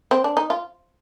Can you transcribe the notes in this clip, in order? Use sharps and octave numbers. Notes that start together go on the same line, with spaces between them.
C4
D4
D#4
F4